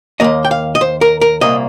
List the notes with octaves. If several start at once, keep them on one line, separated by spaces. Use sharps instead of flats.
D#2 D#3 A#3 D#5
G5
F5
D#5
C5
A#4
A#4
C2 A#2 A#3 D#5